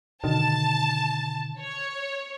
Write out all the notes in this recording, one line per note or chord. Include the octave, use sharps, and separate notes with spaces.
B2 D3 D#3 A5
C#5